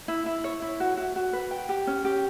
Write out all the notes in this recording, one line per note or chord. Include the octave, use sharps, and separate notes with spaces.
E4
E4
C#5
E4
F#4
F#4
F#4
B4
G5
G4
C#4
G4